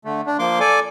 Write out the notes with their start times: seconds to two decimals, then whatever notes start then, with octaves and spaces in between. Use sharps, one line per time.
0.05 D3 A3
0.27 D4
0.39 F3 A#3 C6 D6
0.60 A4 D5 G#5 D6